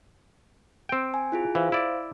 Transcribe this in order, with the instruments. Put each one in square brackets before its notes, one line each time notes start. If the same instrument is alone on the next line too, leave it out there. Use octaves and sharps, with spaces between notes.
[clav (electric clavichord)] C4 G5
[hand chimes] G#5
E4 F4 G#4
[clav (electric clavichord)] E3 [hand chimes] C5 F5
[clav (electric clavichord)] E4 D5